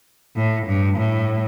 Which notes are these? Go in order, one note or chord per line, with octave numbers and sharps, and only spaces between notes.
A2
G2
A2